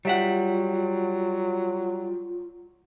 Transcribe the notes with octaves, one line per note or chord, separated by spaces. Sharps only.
F#3 G3 F4 E5 F#5